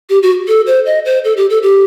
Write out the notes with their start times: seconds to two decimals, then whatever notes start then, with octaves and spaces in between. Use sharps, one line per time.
0.10 G4
0.23 F#4
0.48 A4
0.67 C5
0.86 D#5
1.05 C5
1.24 A4
1.37 G4
1.50 A4
1.63 G4